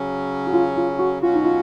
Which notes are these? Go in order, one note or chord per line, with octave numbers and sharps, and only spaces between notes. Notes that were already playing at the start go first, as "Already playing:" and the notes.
Already playing: C#3 F#3 C#4
F#4
F4
F4
F#4
B2 F#3 C#4 F4 F#4
D#4
F4